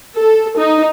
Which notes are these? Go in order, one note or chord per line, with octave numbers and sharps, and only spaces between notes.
A4
D#4